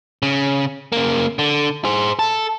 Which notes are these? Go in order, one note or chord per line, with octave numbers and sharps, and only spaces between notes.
C#3
C#3 A#3
D3
G#4 C5
A4